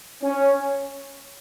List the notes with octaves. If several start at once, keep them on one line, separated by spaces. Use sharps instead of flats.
C#4